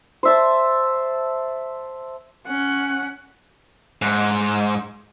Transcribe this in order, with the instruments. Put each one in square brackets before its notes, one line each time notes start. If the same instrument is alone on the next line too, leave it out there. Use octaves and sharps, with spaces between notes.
[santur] C5 E5 A5
[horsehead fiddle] C#4 F#5
[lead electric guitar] G#2